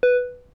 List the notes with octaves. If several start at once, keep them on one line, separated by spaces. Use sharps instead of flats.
B4